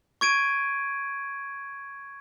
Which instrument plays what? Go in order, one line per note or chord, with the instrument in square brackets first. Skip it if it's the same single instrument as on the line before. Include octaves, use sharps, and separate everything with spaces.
[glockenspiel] C#6 G#6 D7 D#7